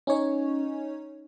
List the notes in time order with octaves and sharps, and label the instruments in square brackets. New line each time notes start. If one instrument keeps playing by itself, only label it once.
[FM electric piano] C#4 D#4 C#5